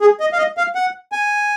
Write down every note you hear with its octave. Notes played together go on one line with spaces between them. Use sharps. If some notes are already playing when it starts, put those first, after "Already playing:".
G#4
D#5
F5
D#5
F5
F#5
G#5